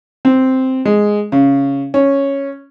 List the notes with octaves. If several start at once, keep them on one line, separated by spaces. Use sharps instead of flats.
C4
G#3
C#3
C#4